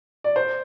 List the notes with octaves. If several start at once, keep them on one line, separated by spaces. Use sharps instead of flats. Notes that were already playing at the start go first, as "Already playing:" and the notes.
D5
C5